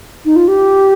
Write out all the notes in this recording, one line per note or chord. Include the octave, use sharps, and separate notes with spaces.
D#4
F4
G4